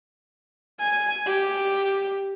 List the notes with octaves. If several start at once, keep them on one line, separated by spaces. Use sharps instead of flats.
G#5
G4